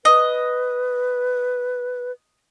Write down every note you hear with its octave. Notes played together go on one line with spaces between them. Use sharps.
B4 D#5